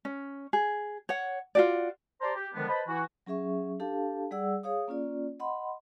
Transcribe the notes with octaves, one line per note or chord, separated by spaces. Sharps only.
C#4
G#4
C#5 F#5
F4 F#4 D5
G4 C5 D5 A5 A#5 C6
G4
D3 D#3 F3 G#3 B3 D4
B4 C5 D#5 A5 B5
E3 E4 F#4
F#3 C#4 G#4 E5 C#6
D4 G4 A4 F5 A5
G3 G#4 D5 F#5 E6
G#4 C#5 F5 D#6
A#3 C#4 F4 D5
D#5 F#5 B5 C6